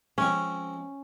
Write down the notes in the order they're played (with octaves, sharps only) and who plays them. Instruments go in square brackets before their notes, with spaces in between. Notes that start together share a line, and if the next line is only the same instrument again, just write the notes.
[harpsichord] F3 G#3 C4 [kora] C#4